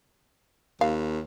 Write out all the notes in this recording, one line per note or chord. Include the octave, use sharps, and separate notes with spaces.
D#2 F5